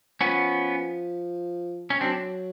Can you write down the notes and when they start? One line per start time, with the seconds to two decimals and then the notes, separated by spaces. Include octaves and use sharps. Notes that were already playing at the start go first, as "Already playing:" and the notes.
0.21 F3 B3 C#4
1.90 C#4
2.01 F#3 C4 D4